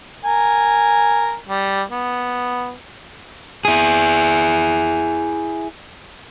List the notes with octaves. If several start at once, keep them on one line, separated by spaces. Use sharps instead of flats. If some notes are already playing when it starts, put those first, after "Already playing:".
A#4 G#5
G3
B3
E4 G#4